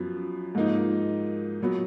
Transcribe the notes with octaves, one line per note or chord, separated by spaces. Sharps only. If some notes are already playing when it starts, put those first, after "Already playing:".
Already playing: F#2 F3 B3
G#2 F3 A#3 D#4
A#2 F#3 B3